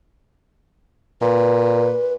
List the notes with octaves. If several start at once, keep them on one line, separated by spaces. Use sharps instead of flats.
A#2 B4